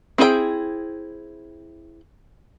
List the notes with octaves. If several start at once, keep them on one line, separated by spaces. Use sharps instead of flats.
C4 E4 G#4 B4 G5